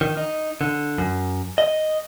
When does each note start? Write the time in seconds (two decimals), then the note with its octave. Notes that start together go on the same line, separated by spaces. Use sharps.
0.01 D#3
0.17 D#4
0.61 D3
0.98 F#2
1.58 D#5